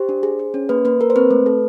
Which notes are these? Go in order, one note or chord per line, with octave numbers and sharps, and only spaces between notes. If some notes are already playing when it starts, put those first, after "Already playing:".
Already playing: G4 C5
D4
G#4
G#4
C#4
A#3 B4
A#3 B4
A#3 A#4
C5
C4 B4
A3
A4